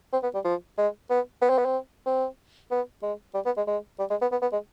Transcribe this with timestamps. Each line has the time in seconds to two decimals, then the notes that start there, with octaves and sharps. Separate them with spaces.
0.13 C4
0.23 B3
0.34 G3
0.45 F3
0.78 G#3
1.10 B3
1.42 B3
1.50 C4
1.58 B3
1.65 C4
2.06 C4
2.71 B3
3.03 G#3
3.34 G3
3.46 B3
3.57 G#3
3.67 G#3
3.99 G3
4.10 G#3
4.21 B3
4.32 B3
4.42 B3
4.53 G#3